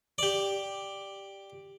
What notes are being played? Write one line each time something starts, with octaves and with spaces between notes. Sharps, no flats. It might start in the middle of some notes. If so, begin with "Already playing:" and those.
G4 D5